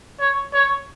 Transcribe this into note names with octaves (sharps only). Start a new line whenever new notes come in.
C#5
C#5